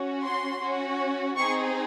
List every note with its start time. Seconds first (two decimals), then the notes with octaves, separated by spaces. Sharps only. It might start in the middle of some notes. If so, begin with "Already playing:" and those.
Already playing: C#4 F#4
0.23 C6
0.61 C#4 F#4
1.36 C4 D#4 G#4 C#6